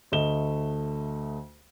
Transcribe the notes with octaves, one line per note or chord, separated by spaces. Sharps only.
D2 A3 D#5 E7 G7